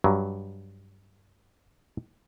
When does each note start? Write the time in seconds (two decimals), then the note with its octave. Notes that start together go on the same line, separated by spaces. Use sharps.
0.04 G2 F#3